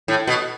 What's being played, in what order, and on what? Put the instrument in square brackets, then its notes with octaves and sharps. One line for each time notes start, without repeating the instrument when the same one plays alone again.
[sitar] A2
B2